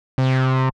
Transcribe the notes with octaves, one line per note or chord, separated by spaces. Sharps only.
C3